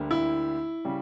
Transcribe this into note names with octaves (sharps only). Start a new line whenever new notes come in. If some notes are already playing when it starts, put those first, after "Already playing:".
Already playing: D2 D3 G3 A#3
E4
C#3 G3